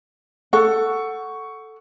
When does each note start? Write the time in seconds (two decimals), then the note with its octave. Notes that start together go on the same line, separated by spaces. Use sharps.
0.53 A4 F#5 C#6